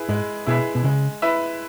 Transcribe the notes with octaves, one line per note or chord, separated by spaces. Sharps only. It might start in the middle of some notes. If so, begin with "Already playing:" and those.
Already playing: E4 G#4 B4
G#2 G#3
B2 E4 G#4 B4 E5
B2
C#3 G#3
E4 B4 E5